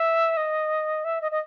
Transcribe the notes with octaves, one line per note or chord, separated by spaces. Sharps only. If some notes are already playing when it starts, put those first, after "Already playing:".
Already playing: E5
D#5
E5
D#5
D#5